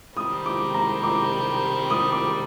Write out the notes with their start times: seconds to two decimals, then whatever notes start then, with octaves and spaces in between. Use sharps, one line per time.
0.16 C3 D#3 G3 C4 D#6
0.46 D6
0.74 A#5
1.03 D6
1.90 D#6
2.12 D6